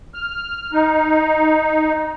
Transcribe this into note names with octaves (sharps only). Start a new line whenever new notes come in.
F6
D#4